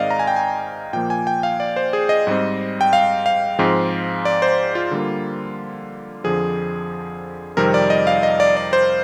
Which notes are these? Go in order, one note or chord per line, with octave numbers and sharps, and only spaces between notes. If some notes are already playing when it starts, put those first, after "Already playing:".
Already playing: G#2 D#3 G#3 C4 D5 D#5 F5
A#5
G#5
G5
G#5
A#2 F3 A#3 G5
G#5
G5
F5
D5
C5
G#4
D#5
G#2 G3 C4
G5
F5
F5
G#2 F3 G#3 C4
D5
C5
F4
D3 G3 A#3
F2 D3 F3 G#4
F2 C3 D#3 G3 C4 A#4
D5
D#5
F5
D#5
D5
D5
C5